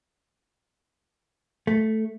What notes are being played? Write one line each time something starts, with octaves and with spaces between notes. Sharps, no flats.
A3